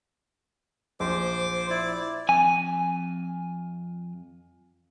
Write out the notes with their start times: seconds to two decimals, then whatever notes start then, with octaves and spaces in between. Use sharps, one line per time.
1.00 A#1 C5 D6
1.70 E4 D5
2.29 F2 G#5